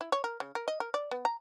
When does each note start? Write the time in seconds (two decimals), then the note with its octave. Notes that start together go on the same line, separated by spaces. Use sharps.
0.01 E4
0.12 C#5
0.24 A#4
0.40 C#3
0.55 A#4
0.68 D#5
0.80 A#4
0.94 D5
1.11 B3
1.25 A#5